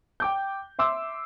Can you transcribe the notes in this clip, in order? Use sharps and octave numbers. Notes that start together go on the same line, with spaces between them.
G5 D6 G6
E5 C6 D6 E6